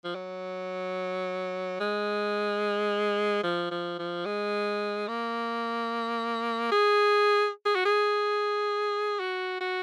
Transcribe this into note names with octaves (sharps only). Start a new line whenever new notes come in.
F3
F#3
G#3
F3
F3
F3
G#3
A#3
G#4
G#4
F#4
G#4
F#4
F#4